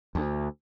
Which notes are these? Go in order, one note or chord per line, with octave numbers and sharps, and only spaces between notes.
D2